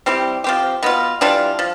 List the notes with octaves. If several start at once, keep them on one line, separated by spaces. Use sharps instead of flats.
G3 C4 E4 G4
F3 C4 G4
B2 B3 F4
E3 G3 D4 F4
F3